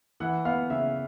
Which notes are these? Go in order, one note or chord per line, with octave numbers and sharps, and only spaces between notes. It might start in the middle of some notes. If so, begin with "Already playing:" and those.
E3 F#5
B3 F5
C#3 E5